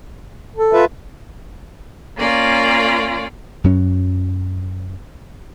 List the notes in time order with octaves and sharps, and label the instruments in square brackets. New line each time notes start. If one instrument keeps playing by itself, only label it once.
[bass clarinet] A4
[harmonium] F4 B4 E5
[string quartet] A#3 C#4 F4 D5
[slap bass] F#2 F#3 C#4